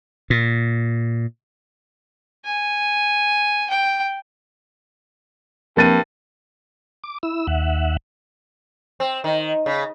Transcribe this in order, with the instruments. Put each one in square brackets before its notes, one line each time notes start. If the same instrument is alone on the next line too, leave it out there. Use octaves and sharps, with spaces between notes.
[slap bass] A#2
[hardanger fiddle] G#5
G5
[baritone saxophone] G2 [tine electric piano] F3 A#3 C4 [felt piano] A#4 A6 D#7
[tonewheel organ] D6
E4 E6
D#2 E5 F#5
[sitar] C4
D#3
C#3